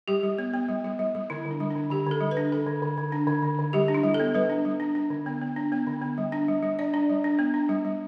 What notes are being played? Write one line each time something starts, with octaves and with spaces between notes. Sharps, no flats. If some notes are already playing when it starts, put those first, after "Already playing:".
G3 G4
G3
B3
B3
G3
G3
G3
G3
D3 E4
D3
D4
G3
D3 D4
D3 G4
D3 A4
G3
B4
D4
D3 A4
D3
D3
D3
D4
D3
D3
D3
G3 G4
D4
E4
G3
A4
B3
G3 B4
D4
G3
D4
D4
D3
B3
B3
D4
B3
D3
B3
G3
D4
G3
G3
D4 D5
D4
G3
D4
B3
D4
G3
G3